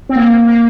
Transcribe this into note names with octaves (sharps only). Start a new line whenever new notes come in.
C4
A#3
A#3